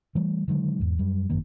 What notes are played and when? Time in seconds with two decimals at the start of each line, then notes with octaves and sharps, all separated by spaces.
0.15 E3 G3 A3
0.48 D3 D#3 F#3 G#3
0.80 E2 G#2
0.99 F#2 G3
1.30 G#1 F#2 D#3 A#3